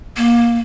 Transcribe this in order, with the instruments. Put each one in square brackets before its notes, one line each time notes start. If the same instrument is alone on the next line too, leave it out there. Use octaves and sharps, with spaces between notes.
[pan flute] A#3